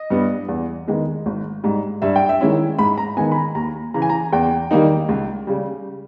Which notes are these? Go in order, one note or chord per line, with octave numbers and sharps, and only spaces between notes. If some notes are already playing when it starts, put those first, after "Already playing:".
Already playing: D#5
G2 G3 B3
E2
D#3 G#3 B3
G#1
G#2 G3
G2 E5
G5
E5
D#3 G#3 C#4 E4
G#2 B5
A#5
D#3 G#3 B3 G#5
B5
A#5
D#2 A#5
C#3 E3 A#5
G#5
A#5
E2 G5
D#3 G3 A#3 D#4
C#2
C#3 G3